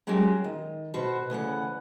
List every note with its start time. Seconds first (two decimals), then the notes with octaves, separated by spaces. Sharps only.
0.07 F#3 G#3 A#3 C#4 F#4 G4
0.44 D#3
0.94 B2 F#4 B4 C5
1.30 D2 C#3 E3 F#5